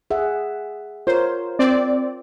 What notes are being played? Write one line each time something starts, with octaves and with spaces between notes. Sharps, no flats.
G#4 E5 F#5
F4 A#4 C5 C#5
C4 D5